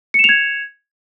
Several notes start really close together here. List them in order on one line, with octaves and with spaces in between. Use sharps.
C#7 E7 F7 G#6